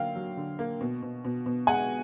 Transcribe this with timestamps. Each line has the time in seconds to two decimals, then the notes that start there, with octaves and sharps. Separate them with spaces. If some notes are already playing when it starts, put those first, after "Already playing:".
Already playing: D3 F#3 A#3 F5 G5
0.16 F#3
0.37 D3
0.59 A#3
0.81 B2
1.02 B2
1.25 B2
1.46 B2
1.67 G#3 F#5 G#5